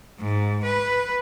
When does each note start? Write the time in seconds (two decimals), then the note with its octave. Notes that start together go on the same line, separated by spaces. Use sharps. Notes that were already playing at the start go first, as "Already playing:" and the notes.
0.20 G#2
0.64 B4